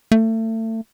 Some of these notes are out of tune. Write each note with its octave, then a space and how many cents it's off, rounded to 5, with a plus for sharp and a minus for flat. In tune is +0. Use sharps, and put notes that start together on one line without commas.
A3 +30